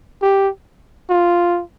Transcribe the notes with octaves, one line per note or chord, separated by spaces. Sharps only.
G4
F4